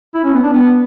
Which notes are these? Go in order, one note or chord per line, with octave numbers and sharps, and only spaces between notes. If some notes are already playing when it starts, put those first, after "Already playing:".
E4
C#4
B3
D4
B3